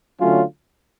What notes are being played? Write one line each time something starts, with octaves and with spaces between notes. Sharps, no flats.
D3 F#3 A3 C#4 F4